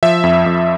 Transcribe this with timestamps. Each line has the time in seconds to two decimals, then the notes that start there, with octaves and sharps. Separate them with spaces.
0.03 F3 E5
0.24 F2
0.46 F2